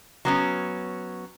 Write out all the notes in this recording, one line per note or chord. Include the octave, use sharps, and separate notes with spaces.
F#3 B3 C#4